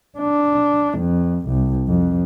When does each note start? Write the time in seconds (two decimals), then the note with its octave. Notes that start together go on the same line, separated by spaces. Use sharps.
0.19 D4
0.99 F2
1.47 C2
1.88 F2